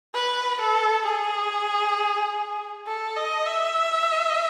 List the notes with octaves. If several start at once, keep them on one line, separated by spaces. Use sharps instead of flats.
B4
A4
G#4
A4
D#5
E5